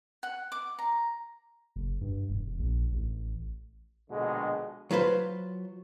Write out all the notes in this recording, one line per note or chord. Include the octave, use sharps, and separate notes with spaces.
F#5
D6
A#5
F#1
G2
E1
A#1
A1
A#1 B2 D3 G#3
F#3 F4 B4 C5